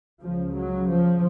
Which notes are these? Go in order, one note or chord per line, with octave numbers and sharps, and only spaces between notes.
C#2 C#3 F3
F#3
F3